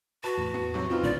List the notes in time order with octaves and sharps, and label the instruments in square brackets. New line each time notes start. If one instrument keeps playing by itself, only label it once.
[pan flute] F#4 [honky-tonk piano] B4 A5
[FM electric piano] E2 A2
[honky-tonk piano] B3
C3 F#3
[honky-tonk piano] C4 D#4 B4 [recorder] F4
[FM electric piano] A#1 A2 D3 [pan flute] D5